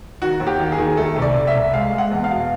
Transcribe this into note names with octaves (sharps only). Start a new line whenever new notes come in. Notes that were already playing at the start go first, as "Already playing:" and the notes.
D#3 F#4
D#2
G4
D#3
G#4
D#3
A3 A4
C2
D5
C2
E5
C2
G#3 F5
G#3
F#5
E2
F5
B2